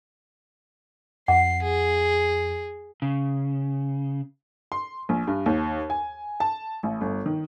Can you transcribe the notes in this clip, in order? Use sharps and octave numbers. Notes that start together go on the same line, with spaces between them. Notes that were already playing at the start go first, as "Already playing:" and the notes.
F2 F#5 C7
G#4
C#3
C6
A#1
G2
D#2
G#5
A5
A1
G1
D#3